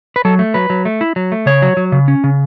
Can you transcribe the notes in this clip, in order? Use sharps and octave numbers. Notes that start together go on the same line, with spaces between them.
B4
F#3 A4
A3
F#3 B4
F#3
A3
E4
F#3
A3
C#3 C#5
F#3
F#3
C#3
C#4
C#3